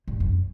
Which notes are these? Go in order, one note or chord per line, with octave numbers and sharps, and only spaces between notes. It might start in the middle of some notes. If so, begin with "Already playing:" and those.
G2
F#2